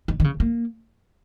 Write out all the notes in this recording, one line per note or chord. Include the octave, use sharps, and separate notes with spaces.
D#3
D#3
C#3
A#3